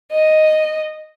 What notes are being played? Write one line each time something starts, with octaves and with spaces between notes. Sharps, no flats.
D#5